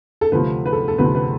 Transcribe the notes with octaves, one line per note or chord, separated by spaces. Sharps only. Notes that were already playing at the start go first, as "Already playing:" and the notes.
A4
D2 C3 F3 A3 B4
B4
A4
A4
D2 C3 F3 A3 B4
B4